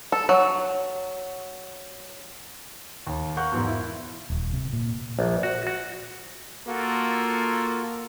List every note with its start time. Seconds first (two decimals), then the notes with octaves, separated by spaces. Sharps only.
0.12 A4
0.29 F#3
3.07 D#2
3.37 A#4 F5 F#5 C#6 F#6 G6
3.52 E2 G#2 B2
3.67 E4
4.30 D#1
4.53 C3
4.73 A#2
5.19 A#1
5.43 F#4
5.67 F#4
6.67 A#3 F4 F#4 A4